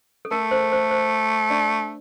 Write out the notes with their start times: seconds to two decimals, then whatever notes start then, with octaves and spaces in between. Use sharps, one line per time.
0.25 A4
0.31 A3 A#4
0.51 C5
0.72 C5
0.91 C5
1.50 D4 D5